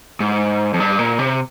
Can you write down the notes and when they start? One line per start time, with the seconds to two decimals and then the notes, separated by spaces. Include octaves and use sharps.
0.20 G#2
0.74 F2
0.80 G2
0.99 A#2
1.19 C3